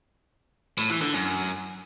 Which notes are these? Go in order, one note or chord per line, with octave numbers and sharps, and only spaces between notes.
A2
E3
D3
F#2